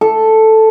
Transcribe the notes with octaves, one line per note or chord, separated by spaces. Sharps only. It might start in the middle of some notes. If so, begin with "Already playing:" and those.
A4